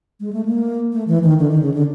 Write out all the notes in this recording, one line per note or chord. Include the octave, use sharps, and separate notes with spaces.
G#3
A3
A#3
A3
E3
D#3
D3
D#3
C#3
D3